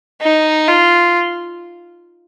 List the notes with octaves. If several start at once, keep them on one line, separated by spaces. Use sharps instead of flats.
D#4
F4